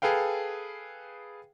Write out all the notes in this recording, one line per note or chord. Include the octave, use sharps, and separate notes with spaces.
G#4 A4 B4 F5 G5